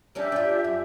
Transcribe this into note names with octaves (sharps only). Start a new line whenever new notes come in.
A#3 C#4 D4 G4 E5
D4 F4
F#2